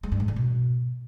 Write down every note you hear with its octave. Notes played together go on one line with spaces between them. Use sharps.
G#3
G2
G#2
D3
B2